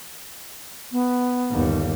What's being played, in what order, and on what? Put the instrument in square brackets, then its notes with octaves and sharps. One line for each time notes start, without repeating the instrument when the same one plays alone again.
[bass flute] B3
[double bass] G1 D#2